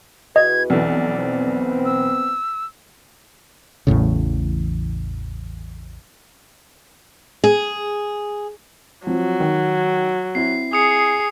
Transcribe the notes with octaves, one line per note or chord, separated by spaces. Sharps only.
E2 F#4 B4 D#5 G#6
B1 F2 E3 D5
B3 C4
E6
A1 E2 A2 C#3
G#4
F3 F#3 C4
D#3
C4 E4 C7
G#4 D#6 C#7